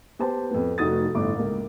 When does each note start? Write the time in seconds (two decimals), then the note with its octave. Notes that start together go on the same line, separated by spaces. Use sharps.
0.19 B3 G4 C5 A5
0.51 F2 B3
0.78 F1 A3 D#4 F#4 D#6 A6
1.15 G1 A2 D6
1.36 C#2 A#3